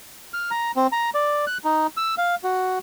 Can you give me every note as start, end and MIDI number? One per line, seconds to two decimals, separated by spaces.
0.33 0.51 89
0.51 0.71 82
0.76 0.87 60
0.92 1.10 82
1.14 1.45 74
1.47 1.58 90
1.64 1.87 63
1.97 2.15 88
2.18 2.35 77
2.44 2.79 66